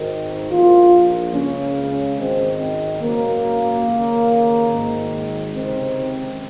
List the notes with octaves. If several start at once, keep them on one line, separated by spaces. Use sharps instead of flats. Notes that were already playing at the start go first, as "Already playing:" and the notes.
Already playing: G#1 G#2 D#3
A#1 A#2 F4
C#2 C#3 C#4
G#1 G#2 D#3 C4
G#1 F#2 C#3 A#3
D#2 C#3
G#1 G#2 D#3
C#2 C3 D#3 C4